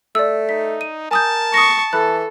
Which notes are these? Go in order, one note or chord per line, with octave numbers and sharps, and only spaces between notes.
A3 D5 E6
D#4 B6
D#7
A#4 G#5 A5 D#6 G6
C#6 D#6 A#6
E3 A4 B5 F#6